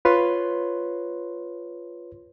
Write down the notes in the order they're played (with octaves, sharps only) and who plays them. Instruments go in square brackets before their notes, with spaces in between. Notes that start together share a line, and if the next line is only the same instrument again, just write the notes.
[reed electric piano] F4 B4 C#5 C6